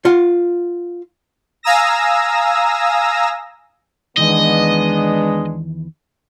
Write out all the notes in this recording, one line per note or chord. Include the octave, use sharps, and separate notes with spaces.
F4 F#5
F5 G#5 A#5 D#6 E6 A#6
E2 D#3 E3 G#3 B3 D4 D#5